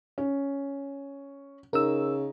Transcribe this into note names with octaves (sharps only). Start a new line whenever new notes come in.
C#4
C#3 D#4 A#4 E6